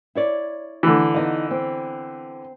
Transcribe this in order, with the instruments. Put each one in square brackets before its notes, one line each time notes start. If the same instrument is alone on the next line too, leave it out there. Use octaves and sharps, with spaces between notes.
[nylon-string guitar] E4 C#5 D5
[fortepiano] D3 E3
[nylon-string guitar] B3 D#4 F5
C4